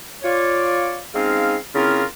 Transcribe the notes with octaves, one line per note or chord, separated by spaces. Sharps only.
F4 C#5 D5
G#3 C4 C#4 D#4 F5
C#3 A#3 C4 E4 F4 A#4